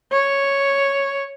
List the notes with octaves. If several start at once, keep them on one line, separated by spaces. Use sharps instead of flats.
C#5